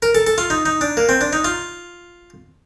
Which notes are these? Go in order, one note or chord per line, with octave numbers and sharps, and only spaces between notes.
A#4
A4
A4
F4
D#4
D#4
D4
A#3
C4
D4
D#4
F4